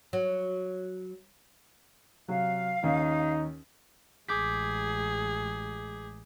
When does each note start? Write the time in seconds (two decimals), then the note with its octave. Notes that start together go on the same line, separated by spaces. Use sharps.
0.13 F#3
2.28 C3 F#3 F5
2.84 D#2 C#4 D#4
4.29 A1 G#3 G#4 D6 G6 B6